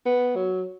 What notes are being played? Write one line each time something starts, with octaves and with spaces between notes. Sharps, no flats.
B3
F#3